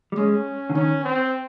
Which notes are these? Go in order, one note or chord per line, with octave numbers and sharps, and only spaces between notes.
G3
G#3 C#4
D3
D#3 C#4
C4